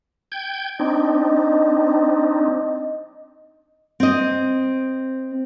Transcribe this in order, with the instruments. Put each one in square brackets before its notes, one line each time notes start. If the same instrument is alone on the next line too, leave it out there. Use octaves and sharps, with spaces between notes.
[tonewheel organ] G5 G6 G#6
[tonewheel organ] C4 D4 D#4 [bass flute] D#5
[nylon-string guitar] C4 D#5